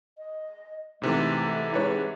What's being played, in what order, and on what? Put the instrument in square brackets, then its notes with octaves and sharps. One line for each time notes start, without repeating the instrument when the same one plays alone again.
[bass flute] D#5
[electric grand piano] G#2 C3 E3 [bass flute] A3
[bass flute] G#3 [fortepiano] E4 B4 C#5